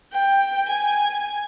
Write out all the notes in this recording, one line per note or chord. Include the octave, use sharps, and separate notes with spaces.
G5
G#5